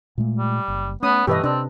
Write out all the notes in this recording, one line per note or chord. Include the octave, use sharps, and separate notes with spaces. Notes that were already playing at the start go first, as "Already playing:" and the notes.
A#2 G#3 A3
G3
F#1
A3 B3 C#4 D#6
G2 B2 E3 A3 G4 B4 D#5
C3 C4 D4